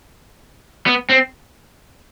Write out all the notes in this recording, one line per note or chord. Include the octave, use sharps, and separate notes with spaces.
B3
C4